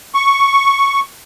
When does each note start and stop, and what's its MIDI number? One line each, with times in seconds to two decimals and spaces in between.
0.15 1.00 85